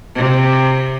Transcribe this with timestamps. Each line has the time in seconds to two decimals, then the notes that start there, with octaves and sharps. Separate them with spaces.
0.16 C3